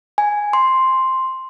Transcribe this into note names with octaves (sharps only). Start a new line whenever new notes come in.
G#5
C6